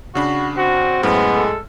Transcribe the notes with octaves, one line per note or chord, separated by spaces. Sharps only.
C#3 D4 F#4 B5
C4 F#4
F#2 A2 G#3 B3 F6
A4